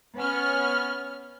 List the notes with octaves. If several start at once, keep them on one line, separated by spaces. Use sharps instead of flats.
B3 C#4 F6